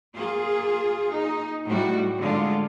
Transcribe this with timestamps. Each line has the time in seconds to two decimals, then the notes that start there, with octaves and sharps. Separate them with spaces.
0.14 A#3 F4 G#4
1.09 D#4
1.66 A2 G3 F#4
2.18 D3 G#3 F4